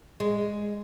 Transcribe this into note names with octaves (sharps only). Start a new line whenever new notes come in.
G#3